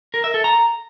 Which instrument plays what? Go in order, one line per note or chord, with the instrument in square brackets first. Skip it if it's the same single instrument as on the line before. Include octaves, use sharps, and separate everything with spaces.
[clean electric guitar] A#4
E5
A4
A#5